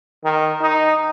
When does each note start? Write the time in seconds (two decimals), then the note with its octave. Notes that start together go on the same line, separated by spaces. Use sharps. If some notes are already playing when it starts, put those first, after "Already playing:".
0.25 D#3
0.61 D#4